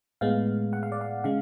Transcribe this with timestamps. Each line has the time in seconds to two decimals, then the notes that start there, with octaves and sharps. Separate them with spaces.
0.21 A2 G#3 B3 F5
0.73 F#5
0.83 F5
0.92 D5
1.01 F5
1.24 C#3 G#3 F5